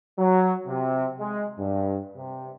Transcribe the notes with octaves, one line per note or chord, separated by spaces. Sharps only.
F#3
C3
G#3
G2
C3